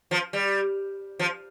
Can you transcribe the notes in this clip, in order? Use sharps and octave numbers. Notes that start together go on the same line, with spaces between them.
F3
G3
F3